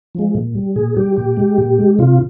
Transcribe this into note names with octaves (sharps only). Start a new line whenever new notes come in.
F3 G#3
A#2
G3
A#2 G#4
G3 G4
A#2 G4
G#3
A#2
G#3
C3 F4